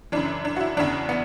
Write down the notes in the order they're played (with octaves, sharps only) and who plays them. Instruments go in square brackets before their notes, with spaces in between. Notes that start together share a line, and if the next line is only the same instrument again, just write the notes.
[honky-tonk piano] F#2 C#3 E3 D4
D4
F#4
E4
E2 C#3 E3 D4
B3